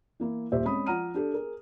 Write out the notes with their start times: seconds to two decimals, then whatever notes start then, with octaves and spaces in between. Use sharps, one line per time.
0.20 E3 A#3 E4
0.52 D#1 A#2 G4 C5 E5
0.64 G#3 C4 C#4 B5 D#6
0.86 F3 F#5 A#5 F6 D#7
1.14 D4 G4 A4
1.34 G#4 A#4